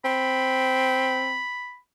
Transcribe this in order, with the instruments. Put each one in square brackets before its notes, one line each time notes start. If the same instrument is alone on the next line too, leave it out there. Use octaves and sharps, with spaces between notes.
[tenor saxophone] C4 [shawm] B5